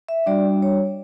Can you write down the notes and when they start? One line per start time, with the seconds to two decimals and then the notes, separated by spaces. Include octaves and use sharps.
0.09 E5
0.26 G3 D4 F#4 D5
0.62 C#5